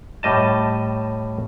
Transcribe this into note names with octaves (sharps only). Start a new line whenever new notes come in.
A2 G3 D#5 A5